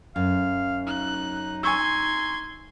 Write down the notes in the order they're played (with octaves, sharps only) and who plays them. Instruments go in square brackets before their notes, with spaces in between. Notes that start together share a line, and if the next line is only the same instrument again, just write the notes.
[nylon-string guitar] F#2 [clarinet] F5
[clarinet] D#4 [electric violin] F#6
[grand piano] G#5 C#6 E6 [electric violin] C6 G#6